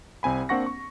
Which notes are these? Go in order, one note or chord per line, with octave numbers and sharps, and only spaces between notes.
C2 C4 G#5 B5
A#3 C4 D4 F#5 C#6 A#6
C#6